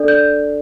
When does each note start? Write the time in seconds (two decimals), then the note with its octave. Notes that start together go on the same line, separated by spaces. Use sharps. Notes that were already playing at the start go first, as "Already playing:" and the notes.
Already playing: D4 A4 D5
0.08 G6